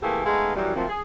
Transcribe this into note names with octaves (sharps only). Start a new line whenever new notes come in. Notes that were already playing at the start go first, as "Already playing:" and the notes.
E3 A3 A#3 C4 G4 G#4
G#3 A3 B3 D#4 B4 F5
F#2 E3 G3
F3 F#3 A3 A#3 C4
G#4